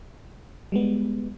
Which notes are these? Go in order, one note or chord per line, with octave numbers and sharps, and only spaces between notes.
G3 G#3 B3